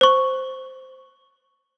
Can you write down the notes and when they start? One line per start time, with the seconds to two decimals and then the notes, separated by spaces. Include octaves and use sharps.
0.01 C5 C#6